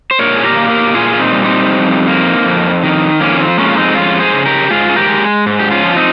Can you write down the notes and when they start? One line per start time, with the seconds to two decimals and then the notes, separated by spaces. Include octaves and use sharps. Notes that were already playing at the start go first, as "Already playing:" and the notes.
0.11 C5
0.19 A#2 A#4 C#5
0.36 G#4
0.44 G4 A#4
0.57 A#3
0.70 G4 A#4
0.94 A#2 F4 G#4
1.13 F4
1.19 C4 D#4
1.32 G3
1.45 C4 D#4
1.70 F2
2.07 A#3
2.45 F2
2.83 D#3
3.20 F2 A#3 C#4
3.39 C4
3.58 G#3 A#3 C#4
3.68 F4
3.77 C4 D#4
3.95 F2 C#4 F4
4.20 G#4 C5
4.33 C#3
4.46 G4 A#4
4.71 G#2 F4 G#4
4.89 G#4
4.96 G4 A#4
5.09 G#3
5.46 G#2
5.59 G4
5.71 C#4 F4
5.84 F3
5.96 C4 D#4